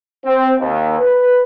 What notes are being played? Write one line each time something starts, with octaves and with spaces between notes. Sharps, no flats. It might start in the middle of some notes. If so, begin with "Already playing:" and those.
C4
D#2
B4